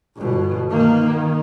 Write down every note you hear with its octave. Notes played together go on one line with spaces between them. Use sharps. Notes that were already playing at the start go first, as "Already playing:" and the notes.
G1 B2
D#3 A#3
D#3